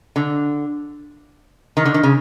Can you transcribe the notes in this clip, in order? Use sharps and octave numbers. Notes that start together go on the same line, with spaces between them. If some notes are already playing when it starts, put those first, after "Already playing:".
D3
D#3
D3
D#3
C#3